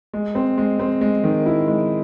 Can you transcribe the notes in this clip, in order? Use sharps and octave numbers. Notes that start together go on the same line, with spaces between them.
G#3
C4
G#3
C4
G#3
D#3
E4
G#3